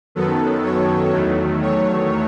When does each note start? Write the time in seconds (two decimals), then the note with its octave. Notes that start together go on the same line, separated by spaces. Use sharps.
0.15 F#2 D#3 F#3 B3 A4
0.63 C#5
1.12 E2 D#3 F#3 A3
1.62 C#5